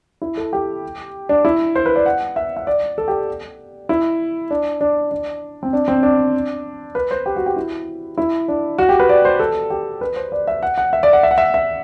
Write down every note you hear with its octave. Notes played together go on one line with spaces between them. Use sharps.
E4
A4
G4
D4
E4
C5
B4
D5
F#5
E5
E5
D5
A4
G4
E4
D4
D4
D4
C4
D4
C4
D4
B4
C5
G4
F#4
G4
E4
E4
D4
F#4
G4
B4
D5
C5
A4
G4
B4
C5
D5
E5
F#5
F#5
E5
D5
F#5
E5
F#5
E5
E5